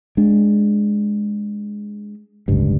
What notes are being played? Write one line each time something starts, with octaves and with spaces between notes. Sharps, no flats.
G#3 D4
D1 G1 C#2 G2